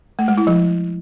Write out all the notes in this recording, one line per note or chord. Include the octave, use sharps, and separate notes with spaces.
A3
G#3
E4
F3